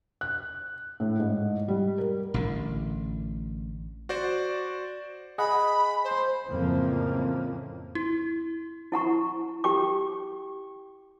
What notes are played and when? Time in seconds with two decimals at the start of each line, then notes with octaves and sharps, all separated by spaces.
0.21 F#6
1.00 A2
1.20 G#2
1.68 G3
1.98 A#4
2.34 A1 A2 D3
4.09 F#4 C5 D5
5.38 G#4 D#5 F#5 B5
6.04 C5
6.49 F2 A2 C#3 E3 F3 A#3
7.95 E4
8.92 E4 F#5 A#5 C#6
9.64 G4 G5 D6